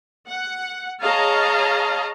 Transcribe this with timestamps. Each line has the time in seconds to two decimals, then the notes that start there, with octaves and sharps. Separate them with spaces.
0.29 F#5
1.02 G#4 C#5 D#5 F5 A5 A#5